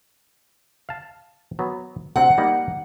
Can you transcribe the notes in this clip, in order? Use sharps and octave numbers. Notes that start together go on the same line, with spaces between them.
F5 A5
F#3 B3
D2 C3 C4 F#5
G3 A#3 D#4